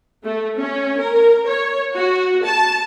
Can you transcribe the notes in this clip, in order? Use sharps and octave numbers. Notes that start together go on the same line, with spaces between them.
A3
C#4
A#4
C#5
F#4
A5